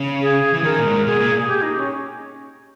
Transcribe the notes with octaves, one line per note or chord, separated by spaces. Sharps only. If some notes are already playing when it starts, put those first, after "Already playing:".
Already playing: C#3
G#4
E3
D#3 A#4
A#2
G#2
B2 G#4
A#2
G#4
G4
D#4
C#4